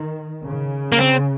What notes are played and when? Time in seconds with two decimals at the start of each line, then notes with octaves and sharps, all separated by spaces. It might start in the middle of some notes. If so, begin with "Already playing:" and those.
Already playing: D#3
0.45 C#3
0.92 A#3
0.99 C4